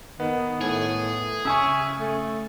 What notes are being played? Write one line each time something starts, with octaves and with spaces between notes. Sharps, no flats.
D#3 B3
A2 G#4
C#3 E5 G#5 C#6
A3